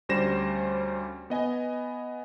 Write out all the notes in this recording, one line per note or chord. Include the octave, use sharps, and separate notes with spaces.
D2 G3 C#4 C5 A#6 E7
B3 D#5 G#5